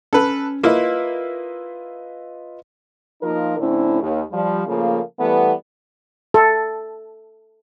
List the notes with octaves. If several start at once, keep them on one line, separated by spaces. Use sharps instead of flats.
C#4 A4 B4
A#3 E4 F4 B4 D#5
F3 A#3 D#4 F4 A#4
A2 D3 C4 C#4 E4
D#2
F3 G3
C#3 F3 A3 A#3
E3 G3 A3 B3
A4